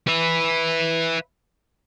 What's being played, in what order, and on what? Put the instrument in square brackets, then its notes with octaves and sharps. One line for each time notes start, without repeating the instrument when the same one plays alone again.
[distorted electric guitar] B4 E5